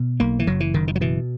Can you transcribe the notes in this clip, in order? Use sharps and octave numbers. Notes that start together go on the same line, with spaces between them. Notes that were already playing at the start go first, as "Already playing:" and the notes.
Already playing: B2
B1 A#3
E3
F#1 F#3
E3
F#1 D#3
D#3
F#3
B2 E3